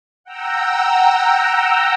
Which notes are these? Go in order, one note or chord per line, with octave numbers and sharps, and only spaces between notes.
F#5 G5 A#5 E6